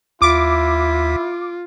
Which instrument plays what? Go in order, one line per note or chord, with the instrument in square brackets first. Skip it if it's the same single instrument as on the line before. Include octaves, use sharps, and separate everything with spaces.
[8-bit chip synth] D#2 B6 [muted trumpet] E4 [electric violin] F4 [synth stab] D6